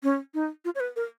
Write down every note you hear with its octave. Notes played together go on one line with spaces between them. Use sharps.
C#4
D#4
F4
C#5
B4
A#4